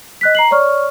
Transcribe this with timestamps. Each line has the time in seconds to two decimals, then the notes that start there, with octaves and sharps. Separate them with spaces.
0.21 D#5 F#6 B6
0.35 A#5 C7 F#7
0.51 C#5 D5 C#6 F6